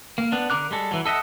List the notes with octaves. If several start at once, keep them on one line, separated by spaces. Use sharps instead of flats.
A#3
B3 D4
D3 A#4 D6 F#6
G3 G#3 A4
E3 F#3
A4 D#5 E5 F#5